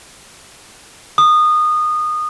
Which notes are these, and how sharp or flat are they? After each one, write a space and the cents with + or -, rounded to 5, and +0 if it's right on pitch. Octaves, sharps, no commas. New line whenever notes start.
D#6 -20